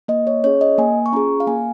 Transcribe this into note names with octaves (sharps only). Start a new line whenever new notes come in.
A#3 D#5
C#5
C#4 G#4 C#5
D#5
A#3 G#5
C#6
C#4 F4 G#4 A#5
F5
A#3 G#5